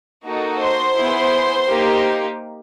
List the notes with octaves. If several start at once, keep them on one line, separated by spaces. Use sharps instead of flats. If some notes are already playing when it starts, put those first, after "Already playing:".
A#3 D#4 F#4 A4
C5 C6
B3 E4 G#4
A#3 D#4 G4